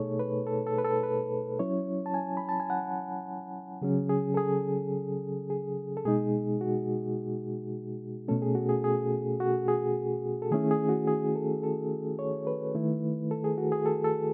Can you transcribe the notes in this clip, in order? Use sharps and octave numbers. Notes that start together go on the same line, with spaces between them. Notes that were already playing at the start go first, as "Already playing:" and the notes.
Already playing: B2 A3 D#4 G#4 A4 C#5
B4
A4
A4
B4
A4
B4
F#3 C#4 E4 C#5
A5
G#5
B5
A5
G#5
F#5
C#3 F#3 C#4 G#4
G#4
A4
G#4
G#4
A4
B2 G#3 D#4 G#4
F#4
B2 A3 C#4 A4
G#4
F#4
G#4
G#4
F#4
G#4
A4
D#3 A3 C#4 E4 G#4
G#4
F#4
G#4
A4
A4
C#5
B4
D#3 A3 E4
A4
G#4
F#4
G#4
A4
A4